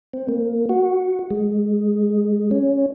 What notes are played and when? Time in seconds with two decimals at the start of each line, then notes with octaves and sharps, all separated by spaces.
0.13 C4
0.28 A#3
0.69 F#4
1.30 G#3
2.51 C#4